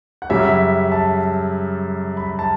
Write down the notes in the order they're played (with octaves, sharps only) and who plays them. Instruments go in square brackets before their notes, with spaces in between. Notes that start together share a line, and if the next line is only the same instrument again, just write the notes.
[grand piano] F#5
F#2 C#3 G3 C#4 E5
A5
B5
A5